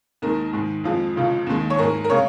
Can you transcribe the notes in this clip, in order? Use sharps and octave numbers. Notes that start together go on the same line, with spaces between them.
D#2 D#3 G#3 A#4
G#2 D#3 G#3
F2 F3 G#3
C#2 C#3 F3
D#2 D#3 G#3
C#5
G#2 G#3 A#4
A#4
C#3 G#3 C#5